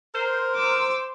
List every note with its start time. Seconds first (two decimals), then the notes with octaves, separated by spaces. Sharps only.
0.14 A#4 C5
0.55 D6 E6